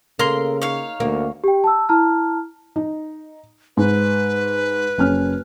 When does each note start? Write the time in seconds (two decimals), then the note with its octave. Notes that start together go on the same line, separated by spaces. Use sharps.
0.19 C#3 A#3 A4 A#4 C6
0.62 D#4 C#5 F5
1.00 D2 A#3
1.44 G4 G5
1.64 A5 E6
1.89 E4 A5 A#5 F6
2.76 D#4
3.77 G#2 B4
4.98 F#1 C#4 F6